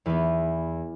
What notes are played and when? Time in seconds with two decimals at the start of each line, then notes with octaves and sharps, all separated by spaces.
0.06 E2 E3 B3 B4